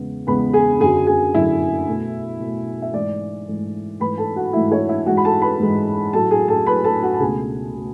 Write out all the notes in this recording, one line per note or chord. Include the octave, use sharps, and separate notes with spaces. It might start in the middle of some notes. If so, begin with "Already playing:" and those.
Already playing: E2 C#3 G#3 B3
E2 C#3 G#3 B3 B4 B5
G#4 G#5
F#2 D3 F#3 G#4 G#5
G#4 G#5
F#2 D3 F#3 E4 E5
B2 A3
B2 A3
E5
G#2 E3 A3 D5
G#2 E3 A3
G#2 E3 A3 B4 B5
A4 A5
F#4 F#5
G#2 E3 A3 E4 E5
C#5
E4 E5
G#2 E3 G#3 F#4 F#5
B5
A4 A5
B4 B5
G#2 E3 G#3
A2 F#3 A3 A4 A5
G#4 G#5
A4 A5
A2 F#3 A3 B4 B5
A4 A5
F#4 F#5
A5
C#2 B2 A3 G#4 G#5
B2 A3